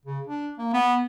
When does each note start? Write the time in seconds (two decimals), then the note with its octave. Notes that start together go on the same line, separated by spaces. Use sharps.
0.05 C#3
0.27 D4
0.58 A#3
0.73 B3